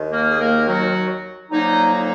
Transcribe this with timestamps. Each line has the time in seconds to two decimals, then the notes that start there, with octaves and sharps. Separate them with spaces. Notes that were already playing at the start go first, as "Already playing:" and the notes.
Already playing: D#2 D#3
0.12 A#3 A#4
0.29 G#4
0.39 A#3 A#4
0.67 F#3 F#4
1.51 F2 D3 F#3 A#3 D#4
1.93 D#4